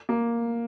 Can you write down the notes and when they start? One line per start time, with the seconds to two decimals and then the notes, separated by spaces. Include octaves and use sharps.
0.09 A#3